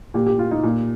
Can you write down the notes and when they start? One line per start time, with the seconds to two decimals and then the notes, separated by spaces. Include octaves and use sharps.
0.14 A#2 G4
0.27 G4
0.39 F4
0.51 D#4
0.63 A#2